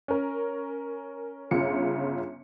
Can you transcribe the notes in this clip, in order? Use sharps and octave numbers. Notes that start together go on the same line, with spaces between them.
C#4 A#4
G1 C#3 F4 C#7